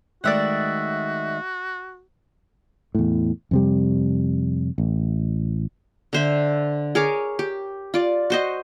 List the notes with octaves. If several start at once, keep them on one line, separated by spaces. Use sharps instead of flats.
D#3 G#3 A3 F#4 D5 E5 F#5
E2 A2
F2 C3 G3
A1
D3 C5 E5
G#4 A#4 C#5 D6
G4
F4 D5
F#4 C5 D#5